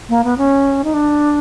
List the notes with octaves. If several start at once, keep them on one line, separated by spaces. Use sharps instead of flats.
A#3
B3
C#4
D#4
D4